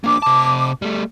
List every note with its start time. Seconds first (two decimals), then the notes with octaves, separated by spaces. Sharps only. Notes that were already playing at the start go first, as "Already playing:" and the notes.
0.04 A#3 D4 D6
0.22 C3 A5
0.82 G3 A3